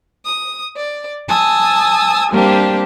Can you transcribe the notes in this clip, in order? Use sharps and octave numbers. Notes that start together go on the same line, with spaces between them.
D#6
D5
G#5 A5 D#6 E6
G3 A#3 C4 D4 G4